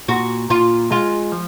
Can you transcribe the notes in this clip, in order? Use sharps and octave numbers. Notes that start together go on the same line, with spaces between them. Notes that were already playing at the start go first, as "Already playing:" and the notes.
A#2 F#4
A#2 F4
G#3 F4
F3